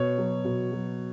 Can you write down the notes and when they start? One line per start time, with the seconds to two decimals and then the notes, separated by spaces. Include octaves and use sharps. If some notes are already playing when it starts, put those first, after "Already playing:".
Already playing: B2 C#5
0.18 F#3
0.44 B2
0.71 F#3